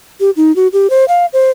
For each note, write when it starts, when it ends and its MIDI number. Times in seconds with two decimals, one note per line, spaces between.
0.20 0.30 67
0.37 0.54 63
0.56 0.68 66
0.73 0.90 67
0.90 1.05 72
1.08 1.26 77
1.33 1.51 72